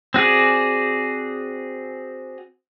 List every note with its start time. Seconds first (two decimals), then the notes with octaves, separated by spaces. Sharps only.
0.14 C4 F#4 G#4 D5